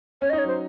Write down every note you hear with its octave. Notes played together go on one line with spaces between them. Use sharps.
C#4 C#5
D#5
D#4
C#5
F#3
C5